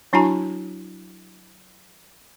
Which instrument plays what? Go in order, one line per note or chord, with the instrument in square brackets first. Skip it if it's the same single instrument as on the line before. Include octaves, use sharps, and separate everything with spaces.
[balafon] F#3 D4 E4 F#4 G#5 A#5